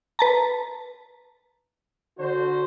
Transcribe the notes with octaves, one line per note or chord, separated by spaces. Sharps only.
B4 A5 A#5
D3 F#4 C5